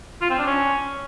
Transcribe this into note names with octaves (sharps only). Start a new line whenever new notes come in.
F4
C4
D4
C#4